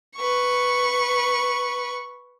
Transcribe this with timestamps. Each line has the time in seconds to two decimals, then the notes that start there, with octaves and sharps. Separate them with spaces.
0.16 B4 C#6